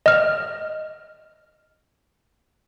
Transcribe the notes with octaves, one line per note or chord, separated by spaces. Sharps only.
D#5 F6